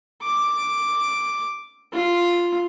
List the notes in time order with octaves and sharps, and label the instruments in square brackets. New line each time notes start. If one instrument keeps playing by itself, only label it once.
[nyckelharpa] D6
F4